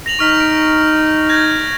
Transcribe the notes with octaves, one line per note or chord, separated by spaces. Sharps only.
A#6 F7 F#7
D#4 C#6 F6 B6
D7
G6 G#6 A#6